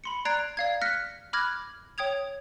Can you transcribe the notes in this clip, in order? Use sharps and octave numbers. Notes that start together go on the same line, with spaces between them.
B5 C6 C#7
D5 A#5 F#6 G#6 C7 D7
D5 F5 G#6
F6 F#6 A#6 B6 C#7
B5 D6 F6 F#6 G#6 A#6
C#5 G5 D#6 G#6 F7